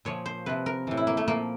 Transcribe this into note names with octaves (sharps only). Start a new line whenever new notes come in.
A#2 F3 C#5
C5
C3 F3 B4
A#4
A2 E3
E4
A#3
A3
A#2 F3 A#3